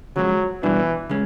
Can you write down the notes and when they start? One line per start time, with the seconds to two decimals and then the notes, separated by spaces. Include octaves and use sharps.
0.16 C#3 F3 F#3 G#3
0.63 B2 E3 G3 B3 D4 F#4
1.09 C#3 G#3 C#4